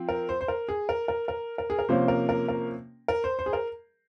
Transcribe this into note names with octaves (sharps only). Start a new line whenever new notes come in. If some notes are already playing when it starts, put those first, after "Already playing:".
Already playing: F3 C4
A#4
C5
C5
A#4
G#4
A#4
A#4
A#4
A#4
G#4
A#4
C3 F3 A#3 C#4 C5
A#4
A#4
A#4
A#4
C5
C5
G#4
A#4